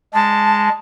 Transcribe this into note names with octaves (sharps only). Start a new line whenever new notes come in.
G#3 A5